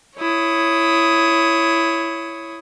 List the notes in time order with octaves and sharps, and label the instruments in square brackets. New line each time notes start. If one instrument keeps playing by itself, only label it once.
[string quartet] E4 C#5 D#6